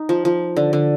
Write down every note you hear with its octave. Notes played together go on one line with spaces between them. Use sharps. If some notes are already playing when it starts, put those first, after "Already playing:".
Already playing: D#4
F3
F3
D3
D3